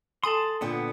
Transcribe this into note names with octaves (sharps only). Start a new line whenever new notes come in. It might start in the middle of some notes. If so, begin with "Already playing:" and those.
A4 G#5 A5 C6 D#6
A#2 D3 B3 G5